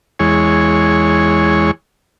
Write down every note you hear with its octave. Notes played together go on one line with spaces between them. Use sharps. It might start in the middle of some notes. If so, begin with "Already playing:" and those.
E2 G#3 C#5